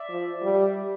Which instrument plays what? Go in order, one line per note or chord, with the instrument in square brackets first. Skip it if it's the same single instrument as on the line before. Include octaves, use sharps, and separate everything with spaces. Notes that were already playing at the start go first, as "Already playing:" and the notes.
Already playing: [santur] D5 E5
[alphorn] F3
G3